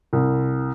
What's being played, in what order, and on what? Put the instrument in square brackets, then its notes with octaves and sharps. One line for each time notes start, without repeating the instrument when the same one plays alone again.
[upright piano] C2